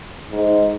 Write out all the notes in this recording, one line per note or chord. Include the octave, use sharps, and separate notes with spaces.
G#2